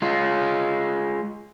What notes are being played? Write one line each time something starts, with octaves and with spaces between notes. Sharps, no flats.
G#3 F4